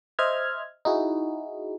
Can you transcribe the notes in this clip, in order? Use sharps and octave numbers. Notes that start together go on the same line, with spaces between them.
C5 D#5 E5 F6 G#6
D#4 E4 F#4 G#4